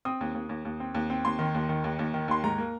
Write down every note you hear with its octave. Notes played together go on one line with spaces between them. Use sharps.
C4 D#6
D#2
D#2
D#2
D#2
C4
D#2
C4
D#2 C6
D#3
D#2
D#3
D#2
D#2
D#3
D#2 C6
G#2 A#5
A#3